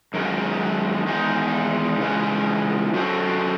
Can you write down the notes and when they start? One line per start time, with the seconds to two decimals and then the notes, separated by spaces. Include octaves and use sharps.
0.14 F#2 D#3 G#3
1.06 E2 D#3 G#3 D#4 G#4
2.00 C#3 E3 G#3 D#4
2.94 F#3 C#4 F#4 A4 C5